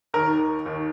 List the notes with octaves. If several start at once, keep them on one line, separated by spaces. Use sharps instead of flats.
D#2 D#3 A#4
D#2 D#3